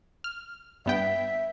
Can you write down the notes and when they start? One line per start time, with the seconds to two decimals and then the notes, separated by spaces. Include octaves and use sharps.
0.24 F6
0.86 G2 B3 E5 G5